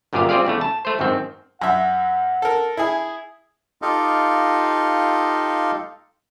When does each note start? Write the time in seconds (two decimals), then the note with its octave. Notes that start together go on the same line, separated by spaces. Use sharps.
0.13 G1 F#2 A#2 G4 G#4 F5
0.29 G3 C4 F4 G#4 D5 F5
0.46 E2 C#3 A3
0.61 A5
0.85 A3 C5
0.99 G#1 F#2 D#3 C4
1.62 F#2 E5 F#5
2.42 A4 A#4
2.77 E4 G#4
3.82 D#4 F4 G4 A4 D#5 F5